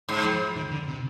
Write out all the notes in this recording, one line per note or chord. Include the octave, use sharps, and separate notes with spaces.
G#2
F3
D#3
D3
C3